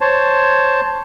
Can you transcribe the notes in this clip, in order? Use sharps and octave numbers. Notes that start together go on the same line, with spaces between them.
C5 C#5 A5